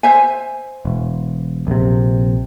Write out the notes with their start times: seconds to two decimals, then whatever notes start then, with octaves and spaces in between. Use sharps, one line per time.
0.03 C5 E5 G#5
0.85 E1
1.67 A#1 C3